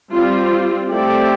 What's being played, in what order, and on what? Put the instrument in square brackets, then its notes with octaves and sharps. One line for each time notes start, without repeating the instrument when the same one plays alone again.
[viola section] G3 C4 F4
[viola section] A3 C4 E4 A4 D5 [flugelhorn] G4